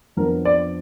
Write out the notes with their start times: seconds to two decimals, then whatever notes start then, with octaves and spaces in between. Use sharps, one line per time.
0.17 F2 F3 B3 D4 A#4
0.45 D5